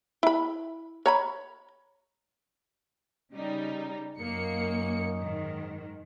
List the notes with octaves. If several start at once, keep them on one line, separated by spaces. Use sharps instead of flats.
E4 B5
C#5 A#5 B5
C#3 G3 D#4
F#2 A#3 D#4 C#7
G#2 D#3